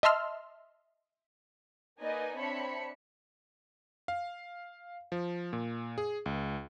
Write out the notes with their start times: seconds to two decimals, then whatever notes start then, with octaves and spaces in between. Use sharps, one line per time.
0.03 D#5 E5 A5 C6 E6 F6
2.00 A#3 D#4 B4 D5 D#5 G#5
2.38 C4 D4 C#5 E5 B5 C#7
4.08 F5
5.12 F3
5.53 A#2
5.98 G#4
6.26 C#2